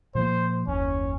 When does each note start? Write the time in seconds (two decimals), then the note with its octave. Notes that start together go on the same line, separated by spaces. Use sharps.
0.15 A#2 F3 A#3 C5
0.67 F#1 D#2 C#4